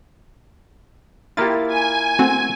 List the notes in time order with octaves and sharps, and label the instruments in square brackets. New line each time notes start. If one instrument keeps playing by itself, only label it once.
[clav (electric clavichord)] A#3 E4 F4 [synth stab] G4 A6
[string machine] G#5
[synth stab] A3 C4 F#4